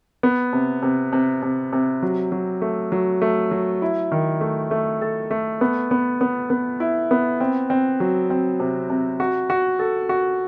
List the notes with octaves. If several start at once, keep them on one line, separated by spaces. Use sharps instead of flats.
B3
C3
C3
C3
C3
C3
F#3
F#3
A3
F#3
A3
F#3
E4
D#3
A3
A3
A4
A3
B3
B3
B3
B3
E4
B3
C4
C4
F#3
C4
C3
C3
F#4
F#4
A4
F#4